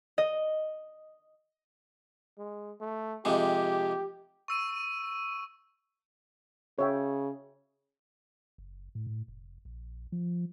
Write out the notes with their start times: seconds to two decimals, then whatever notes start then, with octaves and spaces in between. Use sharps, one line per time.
0.18 D#5
2.38 G#3
2.81 A3
3.25 F2 C3 G#3 G4
4.48 C#6 E6 D#7
6.79 C#3 C#5 E5 G5
8.58 F#1
8.95 A2
9.07 A2
9.28 F1
9.65 A#1
10.12 F3